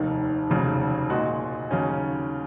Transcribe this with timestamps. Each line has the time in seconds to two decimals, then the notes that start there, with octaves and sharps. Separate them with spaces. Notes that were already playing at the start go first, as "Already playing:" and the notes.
Already playing: F1 D#2 D#3
0.50 F1 D#2 C#3 F#3
1.10 A#2 G#3 D#4 F#4
1.71 D#2 C#3 F#3 C#4